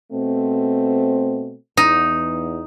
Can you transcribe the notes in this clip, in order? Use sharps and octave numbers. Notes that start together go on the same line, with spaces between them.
B2 A3 C4
E2 D#4